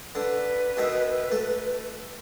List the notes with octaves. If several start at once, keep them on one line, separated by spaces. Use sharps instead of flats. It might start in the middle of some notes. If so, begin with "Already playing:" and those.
D3 B4
B2 D#3 E5
A3